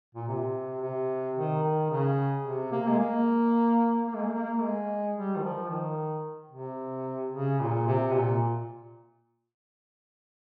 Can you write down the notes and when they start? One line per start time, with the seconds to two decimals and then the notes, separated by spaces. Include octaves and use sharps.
0.15 A#2
0.28 C3
0.82 C3
1.36 D#3
1.63 D#3
1.90 C#3
2.45 C3
2.72 A#3
2.88 G#3
2.99 A#3
4.07 A#3
4.15 G#3
4.23 A#3
4.34 A#3
4.62 G#3
5.16 G3
5.36 D#3
5.43 F3
5.70 D#3
6.52 C3
7.33 C#3
7.60 A#2
7.87 C3
8.14 A#2